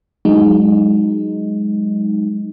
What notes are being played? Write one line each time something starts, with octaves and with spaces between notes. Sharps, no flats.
F#3 G#3 D#4